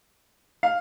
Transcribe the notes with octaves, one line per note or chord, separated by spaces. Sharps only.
F5